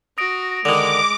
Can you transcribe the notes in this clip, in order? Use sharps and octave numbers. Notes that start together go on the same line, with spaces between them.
F#4 D#6 A#6 D7
D3 D#3 G#3 D6